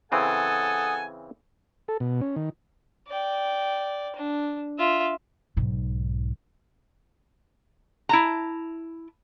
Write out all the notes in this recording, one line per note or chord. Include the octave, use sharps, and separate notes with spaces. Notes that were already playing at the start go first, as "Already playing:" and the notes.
C#3 E3 C4 A4 F#5 G#5 D#6
A4
B2
C#4
D#3
D5 G5
D4
F4 E5
B1 G#2
E4 A5 A#5